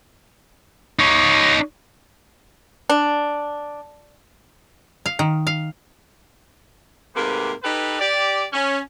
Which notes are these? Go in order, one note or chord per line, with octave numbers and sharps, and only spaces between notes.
D#4 C#5
D4
F5
D#3
F5
G#2 C3 A3 A#3 G4 B4
D#4 G4 A4 B4
G4 D5
C#4